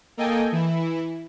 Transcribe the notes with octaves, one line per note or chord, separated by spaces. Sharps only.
A#3 A4 D#5 G5 G#5
E3 E4